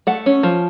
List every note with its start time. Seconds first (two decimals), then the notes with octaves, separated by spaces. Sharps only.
0.07 A3 F#5
0.26 C#4
0.43 F3